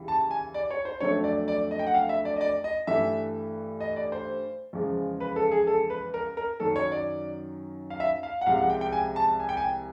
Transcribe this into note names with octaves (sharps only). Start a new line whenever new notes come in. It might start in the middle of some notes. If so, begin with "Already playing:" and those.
Already playing: D#2 C#3 E3 G3
A5
G#5
D5
C#5
C5
F2 D3 F#3 A3 C#5
D5
D5
D#5
G5
F#5
F5
E5
D5
D#5
D5
D#5
G2 E3 A3 E5
D#5
D5
C5
E2 C#3 F3 G#3
B4
A4
G#4
A4
B4
A#4
A#4
F#2 D#3 F#3 A4
C#5
D5
F5
E5
F5
F#5
C2 C3 F3 G#3 F5
F#5
G5
G5
G#5
A5
G#5
G5
G#5